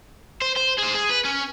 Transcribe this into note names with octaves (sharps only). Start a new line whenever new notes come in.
C5
C5
G#4 C5
G#4
B4
C#4